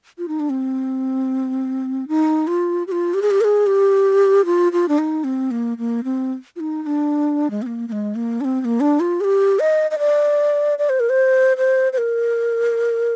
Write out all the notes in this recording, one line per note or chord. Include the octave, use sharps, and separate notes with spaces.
F4
D#4
D4
C4
D#4
F4
G4
F4
G4
G#4
G4
A#4
G#4
G4
F4
F4
D4
D#4
C4
A#3
A#3
C4
F4
D#4
D#4
D4
G#3
C4
A#3
A#3
G#3
A#3
D4
C4
C4
A#3
D4
F4
G#4
G4
D#5
D#5
D5
D5
C5
A#4
C5
C5
C5
A#4